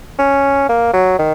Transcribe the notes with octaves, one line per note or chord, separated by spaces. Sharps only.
C#4
A#3
F#3
D#3